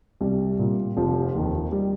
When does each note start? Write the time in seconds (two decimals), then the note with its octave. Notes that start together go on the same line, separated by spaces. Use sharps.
0.21 C2 G3
0.59 A#2
0.97 F1 F3
1.35 D#2 D#3
1.72 G3